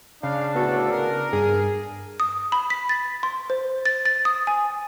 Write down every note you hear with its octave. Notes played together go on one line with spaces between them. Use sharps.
C#3 D4 F5
D2 A2 B3 F#4 A4
A#4
G2 G#4
D#6
B5
B6
A6
C6
C5
A6
A6
D#6
G#5